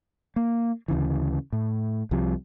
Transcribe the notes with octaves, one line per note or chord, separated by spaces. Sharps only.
A#3
D2 C#3 E3
A2
C2 C3 F3 G3